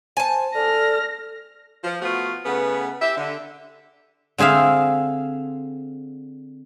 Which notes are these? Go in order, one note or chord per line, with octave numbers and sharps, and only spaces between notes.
C5 G#5 A5
A4 D5 F6 A#6
F3
A3 B3 F4 F#4
C#3 A3 B3
G4 E5
D3
D3 C4 G#4 E5 F5